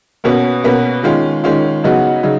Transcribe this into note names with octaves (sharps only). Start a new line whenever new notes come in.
B2 A#3 C#4 F#4 B4
B2 A#3 C#4 F#4 B4
D#3 G#3 C#4 F4
D#3 G#3 C#4 F4
C#3 F#3 B3 D#4 F#4
C#3 F#3 D#4